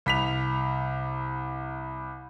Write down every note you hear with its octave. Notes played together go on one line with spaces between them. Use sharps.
C2 B6 F7